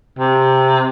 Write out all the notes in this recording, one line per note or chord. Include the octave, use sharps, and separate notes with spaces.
C3